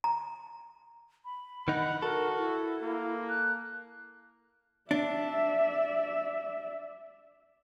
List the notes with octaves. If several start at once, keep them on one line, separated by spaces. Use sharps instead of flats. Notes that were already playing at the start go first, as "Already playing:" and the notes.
A#5
B5
D#3 D#4 F#5
F#4 A4 A#4
E4
A#3
F#6
D4 D5 E5